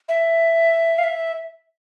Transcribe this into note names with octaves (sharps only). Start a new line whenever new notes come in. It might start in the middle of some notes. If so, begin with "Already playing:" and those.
E5
F5
E5